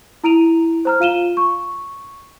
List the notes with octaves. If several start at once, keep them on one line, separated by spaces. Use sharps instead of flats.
E4 A#5 D7 D#7 F7
C5 A#5 F6
F4 F5 D#7 E7 G7
C#6